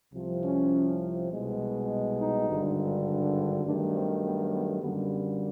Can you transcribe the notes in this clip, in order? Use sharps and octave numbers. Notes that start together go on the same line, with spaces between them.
C2 C3 F3
C#4
C2 B2 G#3
D#4
G#1 G2 D3
G2 D#3 F#3 A3 D4
C4
B3
B3
F#2 D3 G3 A#3 B3
B3